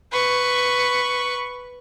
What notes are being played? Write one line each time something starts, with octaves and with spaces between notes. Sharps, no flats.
B4 C#6